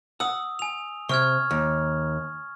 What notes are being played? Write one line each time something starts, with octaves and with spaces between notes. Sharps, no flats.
F#5 D#6 E6
G#5 F7
C3 C#6 F6 G#6
D#2